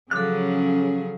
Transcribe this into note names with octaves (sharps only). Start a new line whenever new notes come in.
C#3 F3 F#3 G#4 A4 F5 D6 F#6